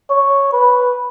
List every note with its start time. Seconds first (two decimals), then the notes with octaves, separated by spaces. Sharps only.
0.10 C#5
0.53 B4